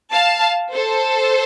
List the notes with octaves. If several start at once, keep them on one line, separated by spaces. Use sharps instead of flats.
F5 A5
A4 C5